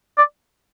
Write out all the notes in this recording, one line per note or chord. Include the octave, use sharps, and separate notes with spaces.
D5